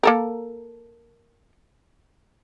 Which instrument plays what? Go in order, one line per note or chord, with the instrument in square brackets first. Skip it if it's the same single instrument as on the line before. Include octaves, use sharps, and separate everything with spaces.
[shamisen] A#3 A4 A#4